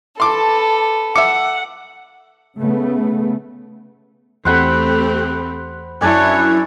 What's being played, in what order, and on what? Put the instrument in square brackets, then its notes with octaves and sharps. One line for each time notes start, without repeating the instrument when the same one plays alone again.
[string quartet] A4 B4 [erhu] A5 [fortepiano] C6 D6
[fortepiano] E5 D6 [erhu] F#5 [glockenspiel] C#7
[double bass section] C#3 A3 B3
[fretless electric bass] E2 [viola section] A3 C4 G4 [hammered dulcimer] C5 F#5 B5
[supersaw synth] F#2 E4 [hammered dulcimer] D4 D5 G#5 [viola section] C#5